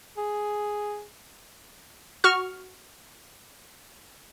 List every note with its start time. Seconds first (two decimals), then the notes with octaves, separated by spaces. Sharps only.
0.17 G#4
2.24 F#4 C#6 F6